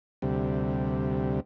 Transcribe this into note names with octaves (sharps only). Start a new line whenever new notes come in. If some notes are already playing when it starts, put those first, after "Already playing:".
D2 C3 G3